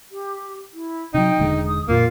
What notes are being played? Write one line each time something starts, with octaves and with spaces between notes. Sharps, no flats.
G4
E4
C3 F#3 D#4 G5
E1 D3 G#3
D#6
F2 A#2 A#3 F4